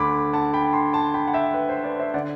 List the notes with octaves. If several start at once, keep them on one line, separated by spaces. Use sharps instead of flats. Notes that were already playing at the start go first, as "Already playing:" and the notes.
Already playing: D2 D3 B5 D6
F#5 A5
G5 B5
A5 C6
A5 C6
G5 B5
F#5
E5 G5
B4
C5
B4 D5
C5 E5
D3 D5 F#5